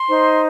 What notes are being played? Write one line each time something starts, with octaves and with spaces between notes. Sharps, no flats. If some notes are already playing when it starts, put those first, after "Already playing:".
Already playing: C6
D#4 C5